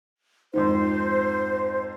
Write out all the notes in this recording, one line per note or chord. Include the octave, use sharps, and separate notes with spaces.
F2 G#2 D#3 C5